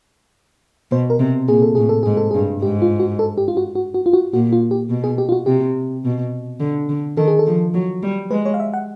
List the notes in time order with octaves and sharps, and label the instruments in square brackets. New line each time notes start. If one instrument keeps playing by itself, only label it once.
[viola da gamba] B2 [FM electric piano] C5
[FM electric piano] A#4
[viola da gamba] C3
[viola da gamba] A#2 [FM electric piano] G#4
[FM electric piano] A4
[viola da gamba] A2 [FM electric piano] G#4
[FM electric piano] A4
[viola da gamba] G#2 [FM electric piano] G#4
[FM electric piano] A4
[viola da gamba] G2 [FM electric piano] G#4
[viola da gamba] G#2 [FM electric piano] G4
[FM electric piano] F4
F#4
A4
G4
F4
F#4
F#4
F#4
F4
F#4
[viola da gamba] A#2 [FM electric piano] F#4
[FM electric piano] F4
G4
[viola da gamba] B2
[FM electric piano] G#4
G4
F4
F#4
[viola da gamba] C3 [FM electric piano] G4
[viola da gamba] B2
D3
D3
[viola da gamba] D#3 [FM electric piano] A4
[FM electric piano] G#4
A4
[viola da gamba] F3
F#3
G3
[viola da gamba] G#3 [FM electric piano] B4
[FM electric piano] C#5
F5
E5
F#5